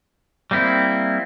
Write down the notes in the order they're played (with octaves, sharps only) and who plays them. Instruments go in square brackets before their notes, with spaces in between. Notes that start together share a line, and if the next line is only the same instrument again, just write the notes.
[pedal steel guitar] G3 A#3 C4 E4